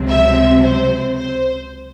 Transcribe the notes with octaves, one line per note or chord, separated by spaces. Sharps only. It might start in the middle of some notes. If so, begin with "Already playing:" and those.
Already playing: C#2 C3 F#3 C4
E5
C5
C5